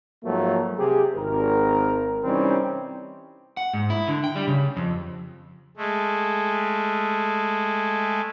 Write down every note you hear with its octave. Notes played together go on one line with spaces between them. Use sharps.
G#2 F3 F#3 A3 A#3
C3 G4 G#4
G#1 A#4
C3 E3 G3 C4 C#4 D#4
F#5
G#2
E4
D3
G5
G3
C#3
F2
G#3 A3